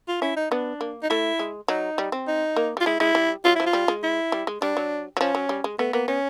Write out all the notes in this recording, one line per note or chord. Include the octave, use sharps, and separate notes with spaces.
F4
C#4 E4
D#4
B3 D4
A#3
D#4
A3 E4
G#3
F#3 D#4
G3
C4
D#4
A#3
G3
F4
G#3 E4
G#3 E4
G3
F#3 F4
F3 E4
F4
G3
G#3
E4
G3
G#3
G3 D4
F#3
F#3
F3 C#4
F#3
G3
G#3
A3 B3
A#3 B3
B3 C#4